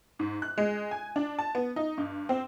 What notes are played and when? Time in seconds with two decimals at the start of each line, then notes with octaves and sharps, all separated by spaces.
0.19 G#2
0.42 F#6
0.58 G#3
0.91 G#5
1.16 D4
1.39 A5
1.55 B3
1.76 D#4
1.98 G2
2.29 C4